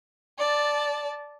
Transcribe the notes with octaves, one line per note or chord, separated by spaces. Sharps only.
D5 A5